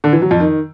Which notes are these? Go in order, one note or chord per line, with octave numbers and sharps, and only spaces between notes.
D3
E3
F#3
F2
D#3